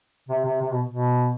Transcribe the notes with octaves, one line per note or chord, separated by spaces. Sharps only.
C3
C3
C3
B2
B2